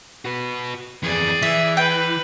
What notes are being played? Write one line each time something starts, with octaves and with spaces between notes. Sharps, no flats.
F#4 B4
F2 E3 G#4 D5
E3 E5
B4 G5